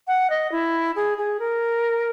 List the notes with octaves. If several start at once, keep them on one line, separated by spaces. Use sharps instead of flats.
F#5
D#5
E4
G#4
G#4
A#4